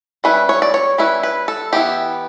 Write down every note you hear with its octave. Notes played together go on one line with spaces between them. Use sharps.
G3 C#4 E4 B4
C#5
D5
C#5
G3 C#4 E4 B4
B4
A4
E3 B3 E4 G4